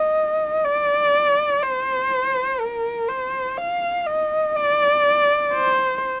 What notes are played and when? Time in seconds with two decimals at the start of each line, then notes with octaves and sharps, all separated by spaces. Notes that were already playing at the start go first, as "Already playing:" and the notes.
Already playing: D#5
0.65 D5
1.62 C5
2.60 A#4
3.08 C5
3.57 F5
4.07 D#5
4.55 D5
5.53 C5